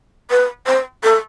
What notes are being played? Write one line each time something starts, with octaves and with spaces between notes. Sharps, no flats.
B4
C5
A4